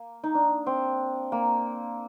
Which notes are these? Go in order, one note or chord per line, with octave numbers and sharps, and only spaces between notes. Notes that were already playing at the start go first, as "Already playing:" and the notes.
Already playing: A#3
D#4
D4
C4
A#3